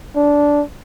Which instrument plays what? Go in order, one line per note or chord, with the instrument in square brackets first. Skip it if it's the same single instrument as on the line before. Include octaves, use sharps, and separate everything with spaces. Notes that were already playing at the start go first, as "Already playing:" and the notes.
[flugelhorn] D4